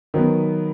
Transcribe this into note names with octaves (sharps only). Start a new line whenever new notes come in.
D#3 F#3 B3